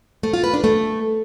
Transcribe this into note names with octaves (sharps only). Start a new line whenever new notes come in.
A3
F4
B4
D4
A3